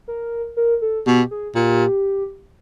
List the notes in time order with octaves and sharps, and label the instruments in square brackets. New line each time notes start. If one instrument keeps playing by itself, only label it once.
[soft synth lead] A#4
A#4
A4
[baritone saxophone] B2 [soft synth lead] G4
[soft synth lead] G#4
[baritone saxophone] A#2 [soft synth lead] G4